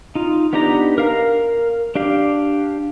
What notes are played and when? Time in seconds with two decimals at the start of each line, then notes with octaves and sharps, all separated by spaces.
0.15 D#4 F4
0.53 B3 D4 D#4 G4 A#5
0.98 A#4 F5 A#5
1.95 D4 G4 F5